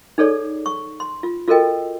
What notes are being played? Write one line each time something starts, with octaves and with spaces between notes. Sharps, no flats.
D#4 G#4 A4 C#5 D5
C#6
C6
F4
F4 F#4 A4 A#4 D#5 G5